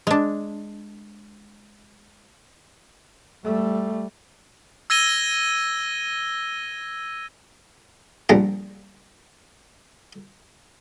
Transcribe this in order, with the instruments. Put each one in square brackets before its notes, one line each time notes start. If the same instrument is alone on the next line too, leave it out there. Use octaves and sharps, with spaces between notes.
[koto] G#3 D4
[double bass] G3 A3
[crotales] E6 G#6 A#6 D#7 G7
[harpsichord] A#1 G3 A#5